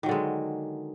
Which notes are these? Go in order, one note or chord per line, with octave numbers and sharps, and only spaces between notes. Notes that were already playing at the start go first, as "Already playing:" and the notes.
D3 D#3 F#3 G#3